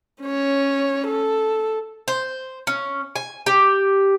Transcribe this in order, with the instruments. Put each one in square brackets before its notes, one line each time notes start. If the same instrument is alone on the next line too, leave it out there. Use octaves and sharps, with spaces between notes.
[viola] C#4 C#5
A4
[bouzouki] C5
C#4
G#5
G4